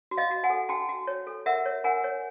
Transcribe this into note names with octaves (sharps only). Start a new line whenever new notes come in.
F#4
D#5 F5
F#4
F#5 G#5
A4
F#4 G5 A5
F#4
C#5
A4
A#4 E5 F#5
C#5
A#4 F#5 G#5
C#5